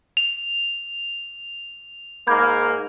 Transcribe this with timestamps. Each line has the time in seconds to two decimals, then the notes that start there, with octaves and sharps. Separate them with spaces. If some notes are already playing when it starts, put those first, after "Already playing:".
0.17 F7
2.27 G#2 A#3 B5 G6 G#6